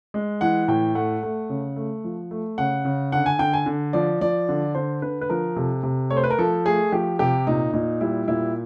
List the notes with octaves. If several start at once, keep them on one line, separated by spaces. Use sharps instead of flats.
G#3
E3 F#5
A2 G5
A3 F#5
A3
C#3
A3
F3
A3
C#3 F#5
C#3
D3 F#5
G#5
D3 G5
G#5
D3
F3 D5
F3 D5
D3
D3 C5
D3 B4
B4
F3 A#4
C3 A4
C3
A3 C#5
C5
B4
A#4
F3 A4
A3 G#4
F3 G4
C3 G4
A#2 D#4
A#2 D#4
G3 E4
A#2 E4